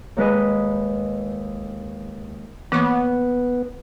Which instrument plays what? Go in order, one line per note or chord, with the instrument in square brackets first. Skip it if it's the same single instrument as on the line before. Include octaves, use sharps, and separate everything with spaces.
[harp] D#2 G#3 B4 D#5
[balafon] E3 A#3 C#6 [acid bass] B3